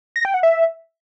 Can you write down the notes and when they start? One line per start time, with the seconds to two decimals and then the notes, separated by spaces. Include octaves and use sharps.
0.16 A#6
0.25 G5
0.34 F#5
0.43 E5